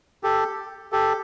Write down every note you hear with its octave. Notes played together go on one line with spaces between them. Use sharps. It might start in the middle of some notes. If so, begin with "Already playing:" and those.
G4 A4
G4 A4